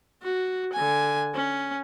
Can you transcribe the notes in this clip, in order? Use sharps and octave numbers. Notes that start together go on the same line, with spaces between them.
F#4
D3 G#5
C#4